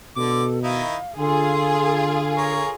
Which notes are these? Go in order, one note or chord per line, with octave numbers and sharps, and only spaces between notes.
B2 D3 A4 D6
D#3 D#4 E4 F5
D3 F4 G#4 A4 C6
A#4 C#5